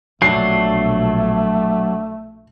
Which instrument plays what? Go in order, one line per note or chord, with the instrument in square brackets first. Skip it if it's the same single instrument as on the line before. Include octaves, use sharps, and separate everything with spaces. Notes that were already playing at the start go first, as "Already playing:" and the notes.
[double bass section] A#1 B2 [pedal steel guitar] F#3 D4 [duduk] A3 [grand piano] C7